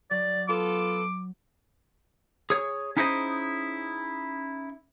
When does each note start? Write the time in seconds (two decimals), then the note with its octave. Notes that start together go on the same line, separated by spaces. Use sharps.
0.11 F#3 D5
0.48 B3 F4 A4 D6
2.50 G#4 C#5
2.97 C#4 D#4 E4 G#4 C5 D#5